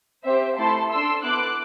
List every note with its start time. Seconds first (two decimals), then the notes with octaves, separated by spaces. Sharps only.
0.25 C4 G4 C5 E5
0.57 A3 E4 A4 A5 C6
0.91 D4 A4 C6 E6
1.23 B3 E4 A4 D6 F#6